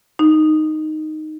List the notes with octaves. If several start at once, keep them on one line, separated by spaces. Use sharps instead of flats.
D#4